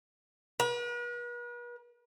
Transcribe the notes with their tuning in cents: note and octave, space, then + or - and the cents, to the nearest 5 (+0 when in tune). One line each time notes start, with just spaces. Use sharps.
B4 -45